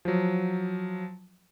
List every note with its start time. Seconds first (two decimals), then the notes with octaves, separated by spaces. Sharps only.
0.05 F3 F#3